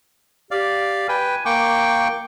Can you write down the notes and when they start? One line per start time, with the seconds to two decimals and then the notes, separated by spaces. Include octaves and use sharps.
0.51 G4 D5 F5
1.09 B4 G5 G#5
1.46 A#3 G5 C#6 D6